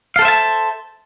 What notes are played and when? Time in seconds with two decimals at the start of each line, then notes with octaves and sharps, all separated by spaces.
0.16 F5
0.19 A4
0.22 C5
0.25 E5
0.28 A5